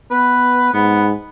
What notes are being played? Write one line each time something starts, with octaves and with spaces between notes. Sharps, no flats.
B3 B4
G#2 B3